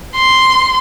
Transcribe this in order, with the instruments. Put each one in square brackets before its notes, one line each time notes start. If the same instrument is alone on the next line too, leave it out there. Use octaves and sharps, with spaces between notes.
[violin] C6